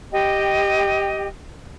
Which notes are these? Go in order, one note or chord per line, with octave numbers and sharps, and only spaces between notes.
G4 D#5 G5